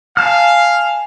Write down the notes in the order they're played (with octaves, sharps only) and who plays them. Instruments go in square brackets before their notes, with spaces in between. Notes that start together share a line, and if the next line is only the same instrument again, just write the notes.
[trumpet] F5 [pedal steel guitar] G#5 A5 F6